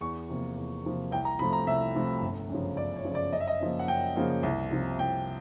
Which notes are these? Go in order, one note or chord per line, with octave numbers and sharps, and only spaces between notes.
E2 C#6
C3 F3 A#3
E2
C3 F3 A#3
C2 G5
A#5
C3 F3 A3 B5
A#5
C2 E5
C3 F3 A3
G1
F#2 C#3 F3
G1 D5
C#5
F#2 C#3 F3
D5
F#2 D#5
E5
D#5
C#3 F3 A#3
F#5
F#2 G5
C#3 F3 A#3
C2
C3 F3
C2 G5